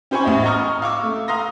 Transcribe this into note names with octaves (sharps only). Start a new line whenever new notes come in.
C#4 G4 C5 G#5 B5 C#6
A1 E2 E4 D#5
D#5 A#5 C#6 D#6 F6
F5 C#6 D6 E6
A3
F5 A#5 C6 D#6 A#6